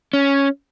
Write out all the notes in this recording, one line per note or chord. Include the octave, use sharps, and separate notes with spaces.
C#4